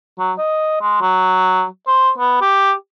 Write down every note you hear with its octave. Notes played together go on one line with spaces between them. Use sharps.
F#3
D#5
G#3
F#3
C5
B3
G4